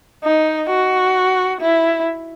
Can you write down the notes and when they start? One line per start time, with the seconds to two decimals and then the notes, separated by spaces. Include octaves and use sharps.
0.24 D#4
0.70 F#4
1.61 E4